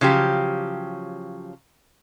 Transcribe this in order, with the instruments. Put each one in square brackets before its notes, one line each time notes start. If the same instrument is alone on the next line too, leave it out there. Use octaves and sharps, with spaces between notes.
[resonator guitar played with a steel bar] C#3 F3 F#3 G4